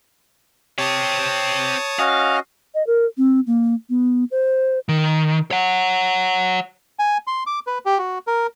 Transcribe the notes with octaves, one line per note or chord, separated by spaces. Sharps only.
C4 G4 C#5 A5 D#6
C#4 F#4 D#5 F5
D#5
A#4
C4
A#3
B3
C5
D#3
C#5 F#5
G#5
C6
D6
B4
G4
F#4
A#4